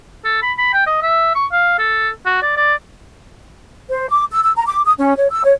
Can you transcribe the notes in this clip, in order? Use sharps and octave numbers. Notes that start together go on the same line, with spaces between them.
A4
B5
B5
G5
D#5
E5
C#6
F5
A4
F#4
D5
D5
C5
D6
E6
E6
A#5
D6
D#6
C#4
C#5
E6
C#5